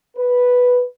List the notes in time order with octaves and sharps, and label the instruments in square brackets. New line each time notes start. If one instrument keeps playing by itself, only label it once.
[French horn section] B4